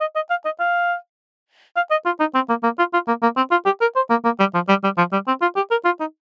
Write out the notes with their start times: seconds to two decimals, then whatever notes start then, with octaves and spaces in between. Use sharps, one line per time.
0.01 D#5
0.16 D#5
0.30 F5
0.45 D#5
0.60 F5
1.76 F5
1.91 D#5
2.06 F4
2.20 D#4
2.35 C4
2.49 A#3
2.63 A#3
2.79 F4
2.93 F4
3.08 A#3
3.22 A#3
3.37 C4
3.51 F4
3.66 G4
3.81 A#4
3.96 C5
4.10 A#3
4.25 A#3
4.39 G3
4.54 F3
4.69 G3
4.84 G3
4.98 F3
5.13 G3
5.28 C4
5.42 F4
5.56 G4
5.71 A#4
5.85 F4
6.00 D#4